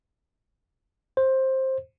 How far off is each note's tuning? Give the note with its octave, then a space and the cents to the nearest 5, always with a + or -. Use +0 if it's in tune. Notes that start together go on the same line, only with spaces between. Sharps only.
C5 +15